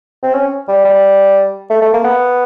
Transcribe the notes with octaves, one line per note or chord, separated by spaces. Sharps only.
C4
C#4
G3
G3
A3
A3
A#3
B3